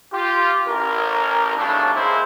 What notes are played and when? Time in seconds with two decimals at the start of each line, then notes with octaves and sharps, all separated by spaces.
0.13 F4 G4
0.67 A1 A#4
1.57 B1 A2 C#3 G3 D4
1.95 G#2 G#3 A#3 E4 A#4 C5